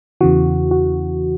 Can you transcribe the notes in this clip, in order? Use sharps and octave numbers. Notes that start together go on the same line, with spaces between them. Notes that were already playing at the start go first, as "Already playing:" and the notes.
E2 C#3 E3 F#4
F#4